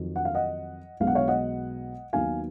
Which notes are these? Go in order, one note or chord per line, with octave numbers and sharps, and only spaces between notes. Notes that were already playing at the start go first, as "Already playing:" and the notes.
Already playing: F2 D#3 F#3
F#5
F5
D#5 F#5
B1 B2 G#3 B3 F5
F#5
C#5 F5
D#5 F#5
D#2 D#3 F#3 B3 D#4 F5 G#5